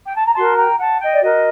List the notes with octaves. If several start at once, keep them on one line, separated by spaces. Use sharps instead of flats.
G5
A5
A#5
F#4 A#4 A5 C6
G5 A#5
F#5 A5
D#5 G5
D5
F#4 A#4 D#5